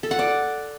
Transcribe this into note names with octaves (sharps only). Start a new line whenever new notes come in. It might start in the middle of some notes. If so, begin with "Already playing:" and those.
A4
F#5
D5